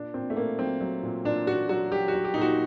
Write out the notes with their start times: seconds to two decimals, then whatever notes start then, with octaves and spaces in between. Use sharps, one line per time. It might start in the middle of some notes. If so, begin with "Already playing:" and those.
Already playing: A#2 D4
0.14 A#2 C4
0.30 A3
0.36 A#2 A#3
0.58 F#3 C4
0.81 F#3
1.03 A#2
1.25 A#2 D4
1.47 A#2 F#4
1.69 F#3 F#4
1.92 F#3 G4
2.08 F#4
2.14 F#3
2.24 G4
2.34 A#2 D#4
2.41 F#4